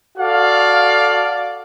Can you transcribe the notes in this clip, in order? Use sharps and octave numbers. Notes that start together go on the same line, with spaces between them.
F#4 A4 D5 F5